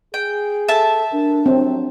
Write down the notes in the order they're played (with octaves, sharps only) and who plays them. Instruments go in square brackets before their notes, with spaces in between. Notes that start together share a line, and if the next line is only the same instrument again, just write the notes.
[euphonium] G#4 [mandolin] G5
[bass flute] A4 [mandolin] E5 A5
[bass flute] D4 [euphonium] A#4
[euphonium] F#3 [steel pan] C4